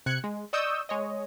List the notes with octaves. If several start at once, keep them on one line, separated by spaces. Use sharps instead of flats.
C3 F#6 G#6 C#7
G#3
D5 D#5 C#6 D#6 E6 G6
G#3 C#5 D#5